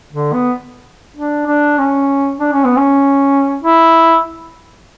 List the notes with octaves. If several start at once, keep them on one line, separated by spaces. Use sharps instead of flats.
D3
B3
D4
D4
C#4
D4
C#4
B3
C#4
E4